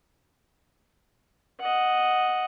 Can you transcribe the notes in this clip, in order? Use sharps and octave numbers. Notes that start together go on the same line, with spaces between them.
D#5 F#5